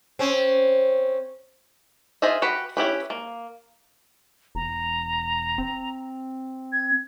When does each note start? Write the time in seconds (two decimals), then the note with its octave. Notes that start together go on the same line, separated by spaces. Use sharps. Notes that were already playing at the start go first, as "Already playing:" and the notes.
0.19 C4 C#4
2.22 F4 G#4 C5 D#5 E5
2.42 F#4 G4 B4
2.77 C#4 E4 G4 B4
3.10 A#3
4.55 E1 A#5
5.58 C4
6.72 G#6